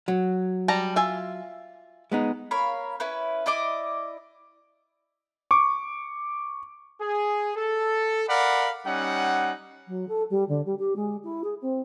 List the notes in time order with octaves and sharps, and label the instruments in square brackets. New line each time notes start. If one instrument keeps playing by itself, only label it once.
[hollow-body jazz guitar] F#3
[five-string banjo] G3 A5 A#5
F4 E5 G#5
[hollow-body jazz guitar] G#3 B3 D#4
[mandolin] A#4 C#5 F5 B5
C#4 E4 B4
E4 D5 D#5 D6
[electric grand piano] C#6 D6
[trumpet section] G#4
A4
A#4 D5 F5 F#5 B5
G3 C#4 D#4 F#5
[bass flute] F#3
A4
G3
D3
G3
G4
G#3
E4
G#4
C4